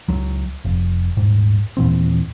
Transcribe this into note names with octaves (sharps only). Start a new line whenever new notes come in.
C#2 F#3
F1
D#1 G#2
D#2 A#2 E3 C4